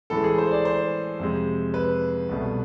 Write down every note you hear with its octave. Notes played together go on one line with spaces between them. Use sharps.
A2 E3 G#3 A4
G#4
C5
D5
C5
F2 C3 G#3
B4
C2 B2 A3